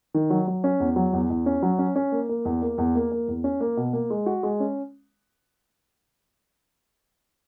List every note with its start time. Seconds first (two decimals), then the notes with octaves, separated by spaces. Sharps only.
0.14 D#3
0.30 F#3
0.48 F#3
0.64 C#4
0.80 E2
0.96 F#3
1.13 E2
1.30 E2
1.46 C#4
1.63 F#3
1.79 C#4
1.96 C#4
2.12 A#3
2.29 A#3
2.45 E2
2.62 A#3
2.78 E2
2.95 A#3
3.12 A#3
3.28 E2
3.44 C#4
3.61 A#3
3.77 B2
3.93 A#3
4.10 G#3
4.26 F#4
4.43 G#3
4.60 C#4